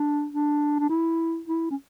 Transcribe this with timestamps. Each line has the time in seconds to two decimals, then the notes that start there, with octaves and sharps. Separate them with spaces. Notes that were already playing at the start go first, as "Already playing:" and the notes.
Already playing: D4
0.33 D4
0.79 D4
0.89 E4
1.48 E4
1.71 C#4